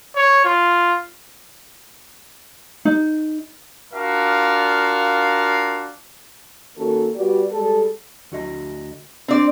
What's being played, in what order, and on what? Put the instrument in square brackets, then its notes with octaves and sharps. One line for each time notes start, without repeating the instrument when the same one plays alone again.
[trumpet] C#5
F4
[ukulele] D#4
[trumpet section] D4 F4 F#4 A#4 F5
[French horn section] D#3 A#3 C#4 F#4 A4
G3 B3 F#4 G4 D5
G3 G#3 A4
[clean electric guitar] D2 F#4 D#5
[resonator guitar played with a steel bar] C4 D5 [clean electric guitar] D4